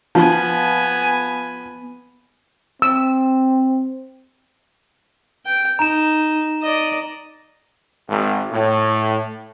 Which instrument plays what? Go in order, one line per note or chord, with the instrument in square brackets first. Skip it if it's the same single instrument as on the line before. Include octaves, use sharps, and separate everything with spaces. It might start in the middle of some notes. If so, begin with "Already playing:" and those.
[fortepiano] F3 [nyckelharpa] B3 G#5
[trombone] C4 [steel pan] E6
[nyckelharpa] G5
[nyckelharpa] D#4 [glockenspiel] A#5 E7
[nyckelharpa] D5 D#5
[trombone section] G#1
A2